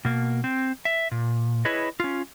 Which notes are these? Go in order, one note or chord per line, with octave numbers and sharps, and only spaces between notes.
B2 A#3
C4
E5
A#2
E4 G#4 B4 C#5 D#5
C#4 F4